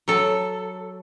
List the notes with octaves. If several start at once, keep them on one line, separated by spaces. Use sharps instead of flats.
F#3 A4